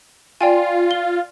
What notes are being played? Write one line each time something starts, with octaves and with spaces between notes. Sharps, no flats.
F4 D5 G5 G#5
G7